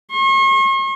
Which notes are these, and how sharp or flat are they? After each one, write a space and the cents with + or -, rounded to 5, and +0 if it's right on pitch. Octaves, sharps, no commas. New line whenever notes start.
C#6 -45